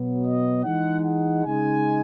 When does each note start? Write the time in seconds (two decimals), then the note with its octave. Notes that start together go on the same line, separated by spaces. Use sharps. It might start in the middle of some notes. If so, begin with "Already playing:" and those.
Already playing: B2 F#3 B3
0.24 D#5
0.64 E3 G#3 D#4 F#5
1.05 F#5
1.45 C#3 G#3 D#4 G#5